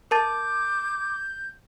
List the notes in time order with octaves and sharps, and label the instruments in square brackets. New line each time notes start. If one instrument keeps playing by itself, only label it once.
[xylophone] A#4 A5 A6 [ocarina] D6 [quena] G6